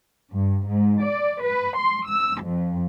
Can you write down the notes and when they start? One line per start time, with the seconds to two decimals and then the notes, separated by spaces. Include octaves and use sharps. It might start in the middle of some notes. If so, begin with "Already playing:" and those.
0.31 G2
0.67 G#2
1.02 D5
1.41 B4
1.76 C6
2.07 E6
2.42 F2